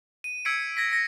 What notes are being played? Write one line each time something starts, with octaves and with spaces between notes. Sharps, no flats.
D#7
E6 G#6 B6 C#7 D7
G#6 A#6 B6
A#6 C#7